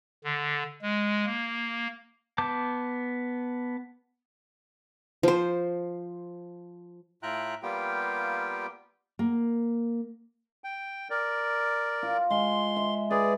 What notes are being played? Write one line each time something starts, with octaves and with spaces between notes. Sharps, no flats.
D3
G#3
A#3
B3 A5 D6 G6
F3 C5
A2 F4 E5 G5 A#5 F#6
G3 A#3 B3 F4 G4 G5
A#3
G5
A#4 D5
F4
G#3 C6
E5
G#4 B4 D5